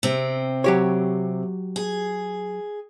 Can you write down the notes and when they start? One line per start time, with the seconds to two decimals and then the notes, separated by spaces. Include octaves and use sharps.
0.03 C3 C4
0.64 F#3 G4 C#5
1.76 G#4